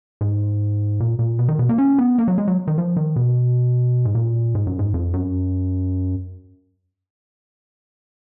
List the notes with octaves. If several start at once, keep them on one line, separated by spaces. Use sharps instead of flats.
G#2
A#2
A#2
B2
D#3
B2
A#3
C#4
B3
A#3
F#3
G#3
F#3
D#3
F3
D#3
B2
G#2
A#2
G#2
F#2
G#2
F2
F#2